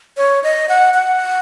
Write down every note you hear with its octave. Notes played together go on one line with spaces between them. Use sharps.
C#5
D#5
F#5
F#5